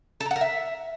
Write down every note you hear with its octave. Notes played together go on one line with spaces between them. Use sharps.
A4
A#5
F#5
A#4
E5